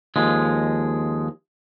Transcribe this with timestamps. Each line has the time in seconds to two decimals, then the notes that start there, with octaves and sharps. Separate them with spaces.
0.16 D#2 F3 G#3